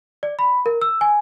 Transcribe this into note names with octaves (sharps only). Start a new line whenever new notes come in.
D5
B5
A#4
E6
G#5